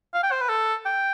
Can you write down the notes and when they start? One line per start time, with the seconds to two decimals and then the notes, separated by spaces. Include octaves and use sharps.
0.14 F5
0.23 G5
0.31 C5
0.41 B4
0.49 A4
0.86 G5